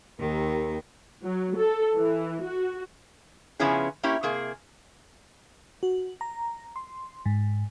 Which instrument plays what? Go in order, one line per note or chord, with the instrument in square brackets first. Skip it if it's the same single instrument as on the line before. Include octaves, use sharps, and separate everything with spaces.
[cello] D#2 D#3 [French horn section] G4 A#4
[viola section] F#3
A4
E3
F#4
[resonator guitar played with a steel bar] C#3 F3 B3 C#4 E4 G#4
A#3 C#4 E4 G4
C3 A#3 G#4
[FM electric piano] F#4
A#5
C6
G#2